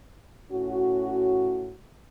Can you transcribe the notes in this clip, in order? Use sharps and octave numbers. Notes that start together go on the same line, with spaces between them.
A2 C#4 F#4